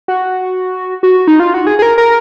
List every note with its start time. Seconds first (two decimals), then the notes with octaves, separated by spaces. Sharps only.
0.08 F#4
1.03 F#4
1.28 D#4
1.40 F4
1.54 F#4
1.67 G#4
1.79 G#4
1.82 A#4
1.98 A#4